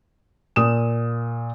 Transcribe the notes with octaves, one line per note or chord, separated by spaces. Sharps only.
A#2 D#6 E7